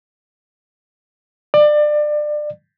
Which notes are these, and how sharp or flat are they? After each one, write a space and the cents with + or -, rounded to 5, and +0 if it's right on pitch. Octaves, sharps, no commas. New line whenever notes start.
D5 +25